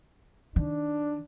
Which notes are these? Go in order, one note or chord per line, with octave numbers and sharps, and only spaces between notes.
D#3 D4